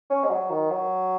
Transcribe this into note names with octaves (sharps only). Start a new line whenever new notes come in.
C#4
G#3
F#3
D#3
F#3